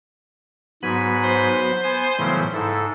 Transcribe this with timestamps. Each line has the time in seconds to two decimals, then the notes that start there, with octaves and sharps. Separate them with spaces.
0.83 G#2 F#3 B3 G#5 B5
1.23 C5
1.83 B3 G#5
2.19 A2 C#3 E3 F#3 G3 B3
2.53 G#2 E4 A4